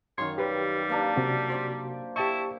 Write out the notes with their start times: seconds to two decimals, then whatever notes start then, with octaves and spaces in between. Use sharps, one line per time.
0.18 F#2 D#3 C#5 F5 C6
0.38 G3 G4 B4
0.90 A#3 D4 A#5
1.17 C3 F#4
1.50 C5 D5 D6
2.16 E4 G4 A5 C#6